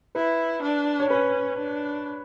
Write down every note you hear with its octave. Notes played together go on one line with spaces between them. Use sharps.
E4 B4
D4
C#5
C#4 B4
D4